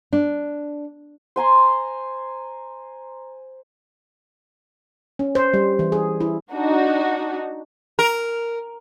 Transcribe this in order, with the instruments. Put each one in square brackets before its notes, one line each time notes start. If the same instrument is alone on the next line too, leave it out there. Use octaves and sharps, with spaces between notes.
[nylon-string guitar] D4
[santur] C5 G#5 A#5 C6
[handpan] C#4
C5
G3
E3
G#4
E4
[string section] D4 D#4 F#4
[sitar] A#4